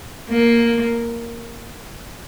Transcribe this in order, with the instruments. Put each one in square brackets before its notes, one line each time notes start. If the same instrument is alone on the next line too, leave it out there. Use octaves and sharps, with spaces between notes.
[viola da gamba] A#3